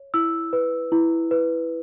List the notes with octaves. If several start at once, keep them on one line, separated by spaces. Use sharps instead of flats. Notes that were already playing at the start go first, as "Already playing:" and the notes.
Already playing: C#5
E4 E6
B4
E4
B4